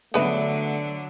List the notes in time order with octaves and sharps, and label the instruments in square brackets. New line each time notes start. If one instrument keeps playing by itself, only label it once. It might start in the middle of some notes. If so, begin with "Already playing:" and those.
[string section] D3 F#3 D4 [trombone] A3 [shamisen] B3 B4 E5